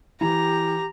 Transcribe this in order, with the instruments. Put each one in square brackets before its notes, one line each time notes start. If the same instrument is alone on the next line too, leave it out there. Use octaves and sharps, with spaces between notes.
[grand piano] E3 [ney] G4 [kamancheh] A#5